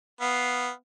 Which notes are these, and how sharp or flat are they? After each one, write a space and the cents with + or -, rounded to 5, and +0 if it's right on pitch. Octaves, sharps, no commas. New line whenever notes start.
B3 +0 F5 +0